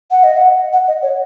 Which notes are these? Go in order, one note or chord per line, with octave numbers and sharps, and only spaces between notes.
F#5
D#5
F#5
F#5
D#5
C#5